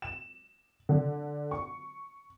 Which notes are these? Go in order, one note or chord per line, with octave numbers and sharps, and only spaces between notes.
E7
D3
C#6